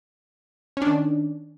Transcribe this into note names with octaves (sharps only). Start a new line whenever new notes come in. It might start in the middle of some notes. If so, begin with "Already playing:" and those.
D#3 C#4 D4